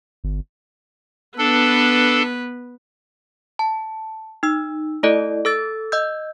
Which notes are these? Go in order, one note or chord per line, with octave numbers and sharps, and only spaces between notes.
G1
B3 D4 A4 B4
A5
D#4 E6
A3 E4 A4 D5 D#5
A4 E6 A6
D#5 E6 G6